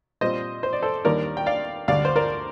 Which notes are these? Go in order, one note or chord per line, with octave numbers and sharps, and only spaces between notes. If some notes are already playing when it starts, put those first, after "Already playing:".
A#2 G3 C4 C5 D#5
C5
D5
A4 C5
D#2 D#3 G3 A#3 D4 A#4 D5
G5
D5 F5
D2 D3 G3 D4 D5 F5
C5
A#4 D5